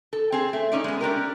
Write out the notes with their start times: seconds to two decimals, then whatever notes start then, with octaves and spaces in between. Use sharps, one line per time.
0.13 A4
0.32 C4 G#4
0.53 A3
0.72 C#4 D#4 D5
0.84 G#3 B3
1.01 C#4 D4 G4 A#4